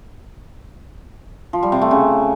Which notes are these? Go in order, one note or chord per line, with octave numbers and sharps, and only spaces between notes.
F3
G3
C3
A3
C#3